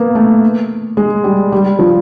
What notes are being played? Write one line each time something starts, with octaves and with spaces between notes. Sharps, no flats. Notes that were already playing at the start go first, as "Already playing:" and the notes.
Already playing: A#3 B3
A3
G#3
G3
G3
F3